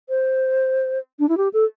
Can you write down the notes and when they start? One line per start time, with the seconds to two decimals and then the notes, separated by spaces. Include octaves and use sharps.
0.09 C5
1.19 D4
1.29 E4
1.37 G4
1.53 A4